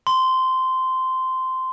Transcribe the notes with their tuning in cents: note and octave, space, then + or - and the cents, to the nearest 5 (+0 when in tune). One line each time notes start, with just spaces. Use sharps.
C6 -15